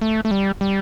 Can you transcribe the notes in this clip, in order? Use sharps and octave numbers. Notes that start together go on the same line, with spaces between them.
A3
A3
G3
G3